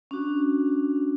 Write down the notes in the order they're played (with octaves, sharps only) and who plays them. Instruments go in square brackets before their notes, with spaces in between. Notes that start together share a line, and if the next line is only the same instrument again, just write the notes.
[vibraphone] C#4 D4 F#4